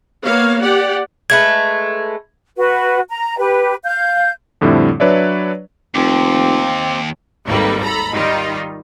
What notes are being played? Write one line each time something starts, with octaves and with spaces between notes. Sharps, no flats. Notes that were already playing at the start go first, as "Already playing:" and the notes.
A#3 B3 C#5 F5
G4 D5 F#5
G#3 A3 B4 G#6
F#4 B4
A#5
G4 B4
F5 G6
F2 A2 D3 G3 C4 E4
F#3 D4 B4 C#5 D5 E5
F1 D#2 C4 D6
G#1 D#2 G3 A#3 A4 B4
A4 A#5 B5
D#3 G3 D#4 F4